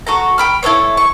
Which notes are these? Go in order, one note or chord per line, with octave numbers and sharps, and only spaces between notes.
F#4 A4 A#5
G5 B5 F6
E4 A4 C5 C#5
C#6